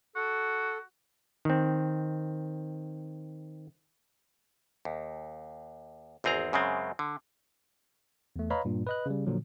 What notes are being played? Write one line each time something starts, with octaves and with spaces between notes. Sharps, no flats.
F#4 A4
D#3 C4
D#2
G#1 E2 C4 G#4 A#5
F#2 C#3 G#3 C4
D3
E2 A3
B4 C#5 D#5 F5 A#5 B5
G2 A#2
B4 D#5 F#6
C#3 G3
A#2 D3 F3 F#3